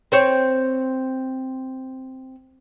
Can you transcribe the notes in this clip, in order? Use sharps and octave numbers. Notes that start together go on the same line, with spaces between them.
C4 C5 C#5